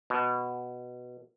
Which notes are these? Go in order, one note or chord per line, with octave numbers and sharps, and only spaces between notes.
B2